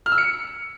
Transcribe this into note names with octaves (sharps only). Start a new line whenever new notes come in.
F6
E6
C#7